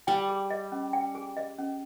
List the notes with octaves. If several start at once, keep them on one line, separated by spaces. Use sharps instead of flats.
G3 G5
G#4
D#5
C#4
G5
G#4
D#5
C#4